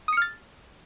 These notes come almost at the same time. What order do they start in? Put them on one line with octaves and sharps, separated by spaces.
D#6 C#7 F6 A6